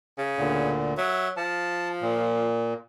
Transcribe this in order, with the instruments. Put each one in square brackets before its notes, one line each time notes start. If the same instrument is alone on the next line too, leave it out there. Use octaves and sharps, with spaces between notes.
[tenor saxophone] C#3
[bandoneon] D2 A#2 D3
[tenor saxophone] F#3 [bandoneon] E5
[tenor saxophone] F3 [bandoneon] A5
[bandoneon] A#2